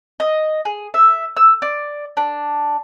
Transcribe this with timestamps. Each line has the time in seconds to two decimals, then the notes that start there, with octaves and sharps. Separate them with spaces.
0.20 D#5
0.65 G#4
0.94 E5
1.37 E6
1.62 D5
2.17 D4